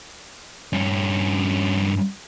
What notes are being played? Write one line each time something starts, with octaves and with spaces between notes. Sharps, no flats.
G2 C#4